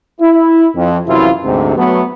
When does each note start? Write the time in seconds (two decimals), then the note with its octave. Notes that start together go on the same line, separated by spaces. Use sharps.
0.21 E4
0.76 F2
1.08 F#2 C3 E3 F#3 E4 F4
1.44 D2 G#2 C3
1.77 F#3 A3 B3